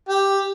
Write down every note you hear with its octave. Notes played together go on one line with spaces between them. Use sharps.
G4